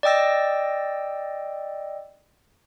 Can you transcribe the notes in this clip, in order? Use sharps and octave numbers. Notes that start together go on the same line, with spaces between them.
D5 D#5 G5 E6 A#6